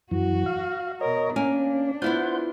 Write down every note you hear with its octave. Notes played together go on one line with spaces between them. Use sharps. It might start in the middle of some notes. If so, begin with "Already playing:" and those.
F#2 E3 F#4
F5
B2 A#4 C#5 D#5
A#3 C#4 D4 F5 G#5
B3 E4 F4 C5 F#5 G6